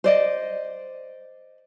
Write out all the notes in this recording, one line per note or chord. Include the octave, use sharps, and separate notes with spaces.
C5 D5 D#5